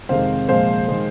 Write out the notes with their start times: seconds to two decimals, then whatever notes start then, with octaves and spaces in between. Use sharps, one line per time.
0.09 F2 C3 D#3 G#3 C5 F5
0.49 A#2 F3 G#3 C5 F5
0.88 D#3 G#3